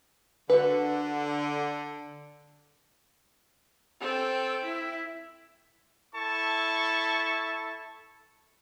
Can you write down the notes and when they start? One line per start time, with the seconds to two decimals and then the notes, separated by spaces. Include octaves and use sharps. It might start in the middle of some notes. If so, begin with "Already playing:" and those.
0.50 D3 F#4 B4
4.01 C4 A4 G5
4.64 E4
6.15 E4 A4 A5 C#6